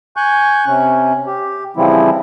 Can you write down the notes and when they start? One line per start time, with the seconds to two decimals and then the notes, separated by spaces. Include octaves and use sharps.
0.17 G#5 C#6 F#6 G6
0.67 C3 C#4
1.27 G4
1.77 C#3 E3 F3 G3 C4 E4